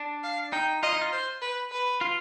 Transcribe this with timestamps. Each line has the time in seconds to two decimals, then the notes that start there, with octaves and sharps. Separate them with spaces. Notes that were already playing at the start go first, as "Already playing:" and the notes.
Already playing: D4
0.23 F5
0.52 D#4 G5
0.83 F4 D#5
0.93 D#4
1.01 F4
1.12 C5
1.42 B4
1.72 B4
2.01 F4